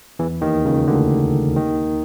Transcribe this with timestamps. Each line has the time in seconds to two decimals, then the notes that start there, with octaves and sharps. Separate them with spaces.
0.19 E2 E3
0.42 D#2 D#3
0.65 C#2 C#3
0.87 D2 D3
1.57 D#2 D#3